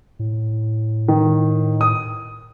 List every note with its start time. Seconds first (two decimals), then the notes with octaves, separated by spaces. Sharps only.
0.19 A2
1.08 D#3
1.81 D#6